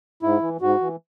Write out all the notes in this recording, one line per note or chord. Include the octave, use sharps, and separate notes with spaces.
G#2 E4
E3
G#2 F#4
E3